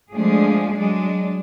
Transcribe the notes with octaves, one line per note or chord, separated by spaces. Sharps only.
F3 G#3 A3 D4 G#4
F#3 G#3 D4